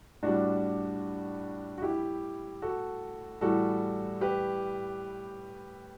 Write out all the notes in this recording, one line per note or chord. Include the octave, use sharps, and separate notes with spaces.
A2 G3 D4 F#4
F#4
E4 G4
F#4 A4
A2 E3 G3 F#4 A4
G4 B4